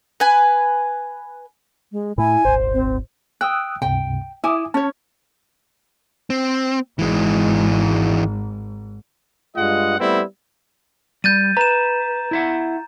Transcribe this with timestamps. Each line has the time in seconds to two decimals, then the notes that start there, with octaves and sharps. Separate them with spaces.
0.20 B4 G#5
1.92 G#3
2.18 A2 A3 E4 G#5
2.45 D#1 G#1 C5
2.74 C4
3.41 G5 D#6 E6 F#6
3.82 C#2 G2 C3 G5
4.44 E4 E5 G#5 D6 D#6
4.74 C#4 C#5 A5
6.30 C4
6.99 G#1 G#2 E3 G#3
9.56 G2 G#3 F4 D#5 F#5
9.99 G3 A3 B3 C4 E4
11.24 G3 G6 A6 D#7
11.57 B4 A#5 E7
12.31 E4 E5 F#5